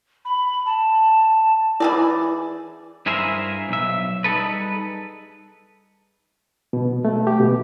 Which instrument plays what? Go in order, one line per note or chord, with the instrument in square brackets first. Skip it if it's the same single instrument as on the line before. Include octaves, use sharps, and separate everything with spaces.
[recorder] B5
A5
[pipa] E3 G#4 D5 [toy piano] E4
[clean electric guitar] G2 E4 G#4 A#4 C5 E5
B1 E5
G3 D#4 G#4 A4 B4
[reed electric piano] B2
A3
G4
B2